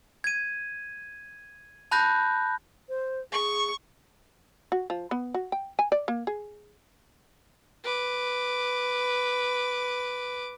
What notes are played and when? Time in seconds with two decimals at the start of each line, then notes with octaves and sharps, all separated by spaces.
0.24 G#6 D#7
1.91 A5 B5 F#6 G6 A#6
2.89 C5
3.32 G#4 C#6
4.72 F#4
4.90 F3
5.11 B3
5.34 F#4
5.52 G5
5.79 G#5
5.92 D5
6.08 A#3
6.27 G#4
7.84 B4 D6